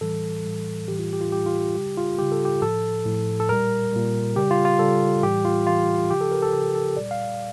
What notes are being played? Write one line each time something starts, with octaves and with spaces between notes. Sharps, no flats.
A2 E3 G3 A4
A2 E3 G3
A2 E3 G3 G4
F4
G4
F4
A2 E3 G3 G4
F4
G4
C#3 G3 G4
F4
C#3 G3 G4
A4
G4
A2 F3 A4
A2 F3
A4
A#2 G3 A#4
A#2 G3
C#3 G3 G4
F4
F4
C#3 G3 A4
A2 E3 G3 G4
F4
A2 E3 G3 F4
C#3 F3 G4
A4
A#4
A4
C#3 F3 A4
A4
A#2 G3 D5
F5